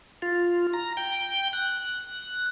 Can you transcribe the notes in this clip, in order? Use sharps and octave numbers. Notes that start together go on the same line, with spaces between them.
F4
A#5
G5
F#6